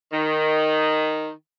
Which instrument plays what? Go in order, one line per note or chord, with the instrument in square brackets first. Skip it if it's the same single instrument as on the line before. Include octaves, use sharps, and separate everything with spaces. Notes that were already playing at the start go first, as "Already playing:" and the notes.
[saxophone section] D#3